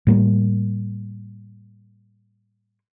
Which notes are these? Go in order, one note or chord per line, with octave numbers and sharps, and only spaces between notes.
A2 G3 A#3